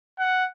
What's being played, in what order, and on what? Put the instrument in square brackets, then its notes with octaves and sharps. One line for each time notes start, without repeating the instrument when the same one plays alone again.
[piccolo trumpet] F#5